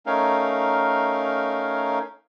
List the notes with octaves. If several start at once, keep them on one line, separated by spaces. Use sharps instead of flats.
A3 C#4 D#4 A#4 F5